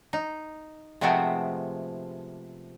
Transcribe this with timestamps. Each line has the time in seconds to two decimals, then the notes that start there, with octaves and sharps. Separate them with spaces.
0.13 D#4
1.01 C3 F3 G#3 A3 B3 C4